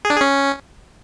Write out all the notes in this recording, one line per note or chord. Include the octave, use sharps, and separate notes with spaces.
G#4
D4
G#4
C#4